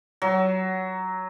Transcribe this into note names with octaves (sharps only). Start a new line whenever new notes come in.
F#3